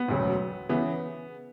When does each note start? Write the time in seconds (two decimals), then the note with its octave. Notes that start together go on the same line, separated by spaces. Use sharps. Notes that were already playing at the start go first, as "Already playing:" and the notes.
Already playing: B3
0.08 E1 D2 C#3 F#3
0.69 C#3 E3 B3